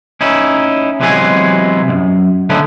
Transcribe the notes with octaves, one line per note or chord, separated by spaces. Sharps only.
C#4 D#4 E4
C3 E3 F#3 G#3 B3 G#5
B1 F#2
D3 A3 B3 C#4 D#4